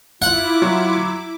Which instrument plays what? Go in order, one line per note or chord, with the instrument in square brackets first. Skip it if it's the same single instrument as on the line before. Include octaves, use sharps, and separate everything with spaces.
[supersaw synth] E4 D6 [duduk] F4 [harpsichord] F#5
[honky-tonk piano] F#3